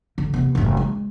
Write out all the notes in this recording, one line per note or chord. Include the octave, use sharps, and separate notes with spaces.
D3
C3 B3
F#1 A2
G#3